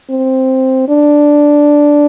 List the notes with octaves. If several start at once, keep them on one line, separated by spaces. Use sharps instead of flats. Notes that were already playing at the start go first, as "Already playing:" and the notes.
C4
D4